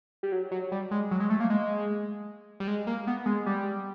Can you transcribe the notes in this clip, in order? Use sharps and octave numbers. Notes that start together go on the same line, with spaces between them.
G3
F#3
F#3
G3
G#3
F#3
G#3
A3
A#3
G#3
G3
G#3
A#3
B3
G#3
G3